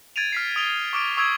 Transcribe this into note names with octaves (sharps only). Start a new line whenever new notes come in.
G#6 A6 D7 D#7 F7
F6 B6 C7
D#6 D7 F7 G7
C#6 D6 F6 D7
C#6 D#6 E6 G#6 D7